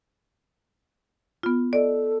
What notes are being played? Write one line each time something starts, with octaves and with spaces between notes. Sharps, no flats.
B3 F4
A4 D5 D#5